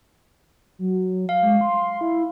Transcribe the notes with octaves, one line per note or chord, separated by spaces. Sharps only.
F#3
F5
G#3
C6
E4